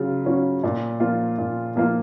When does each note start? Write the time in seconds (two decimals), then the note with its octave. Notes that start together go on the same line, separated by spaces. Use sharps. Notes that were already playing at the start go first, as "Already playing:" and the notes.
Already playing: C#3 F#3 F4
0.25 F#3 C#4 F4
0.64 A#2
1.00 F3 A#3 F4
1.38 A#2
1.76 F3 A#3 F4